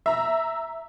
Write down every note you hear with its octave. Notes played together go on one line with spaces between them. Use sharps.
E5 A#5